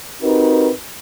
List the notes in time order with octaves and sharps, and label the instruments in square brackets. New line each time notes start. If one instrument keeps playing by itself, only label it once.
[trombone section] C4 D#4 F#4 G4 A#4 B4